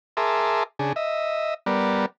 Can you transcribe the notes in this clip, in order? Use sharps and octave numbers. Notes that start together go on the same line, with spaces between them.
G#4 A#4 E5 A5 C6 D6
C#3 D4 G#4
D#5 E5
G3 B3 A#4 D5